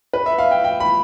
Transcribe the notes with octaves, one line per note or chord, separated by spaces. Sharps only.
B4
E5
F5
G5
G5
B5